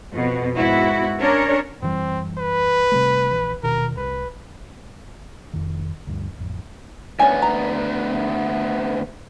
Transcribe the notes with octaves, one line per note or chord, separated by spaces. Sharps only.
F2 B2
G#2 G#3 B3 E4 F#4
C#4 D4 A#4 C#5
F#2 E3 G3 C4
B4
C3 G3 A3
A#1 E3
D#1 B2 D#3 A#4
C2 B4
F1 F2 D#3
D2 G2
A1 F2
D2 B3 C#4 G#5
A#5